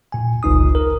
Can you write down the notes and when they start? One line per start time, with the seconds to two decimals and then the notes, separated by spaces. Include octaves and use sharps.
0.12 A#2 G#5
0.43 G1 C#2 D#4 D#6
0.75 A#4